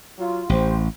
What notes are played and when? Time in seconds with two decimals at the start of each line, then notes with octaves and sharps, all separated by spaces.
0.18 F#3 F4
0.49 A1 G4 C5